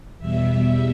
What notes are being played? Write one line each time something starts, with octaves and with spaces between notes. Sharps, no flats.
E2 B2 G3 E5
E5